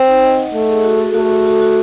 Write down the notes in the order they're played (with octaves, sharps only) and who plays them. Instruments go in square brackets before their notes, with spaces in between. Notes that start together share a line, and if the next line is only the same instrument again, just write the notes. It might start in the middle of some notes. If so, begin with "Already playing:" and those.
Already playing: [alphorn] C4
[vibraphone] D#4
D#5
F#5
[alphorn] A3 [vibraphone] D#5
[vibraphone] G#4
F#4
A4
[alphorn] A3 [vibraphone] F#4
[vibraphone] F#4
F#4
F#4